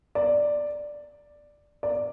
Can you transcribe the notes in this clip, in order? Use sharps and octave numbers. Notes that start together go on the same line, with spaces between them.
D5
D5